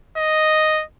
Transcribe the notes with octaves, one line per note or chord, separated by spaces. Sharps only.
D#5